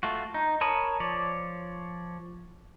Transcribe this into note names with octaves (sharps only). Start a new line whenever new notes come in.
A3 F4 F#4
D#4
A#4 C#5 A5 B5 D#6
F3 C#5 D5